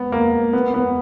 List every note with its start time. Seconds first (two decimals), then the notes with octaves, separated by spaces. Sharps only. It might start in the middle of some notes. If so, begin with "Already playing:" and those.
Already playing: B3
0.12 A#3
0.53 B3
0.74 B3